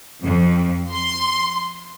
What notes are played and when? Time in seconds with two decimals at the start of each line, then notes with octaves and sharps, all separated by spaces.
0.24 F2
0.93 C6